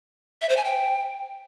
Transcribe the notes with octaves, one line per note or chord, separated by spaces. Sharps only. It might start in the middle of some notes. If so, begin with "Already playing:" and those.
E5
C5
G#5
G5